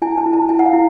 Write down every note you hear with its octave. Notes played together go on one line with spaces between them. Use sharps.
E4 G#5
A5
E4
A5
E4 G#5
F#5
F5
E4